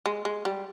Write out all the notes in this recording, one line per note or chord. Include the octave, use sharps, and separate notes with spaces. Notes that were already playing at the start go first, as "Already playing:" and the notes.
G#3
G#3
G3